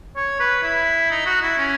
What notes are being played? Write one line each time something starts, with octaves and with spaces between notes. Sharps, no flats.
C#5
B4
E4
D#4
F#4
E4
C#4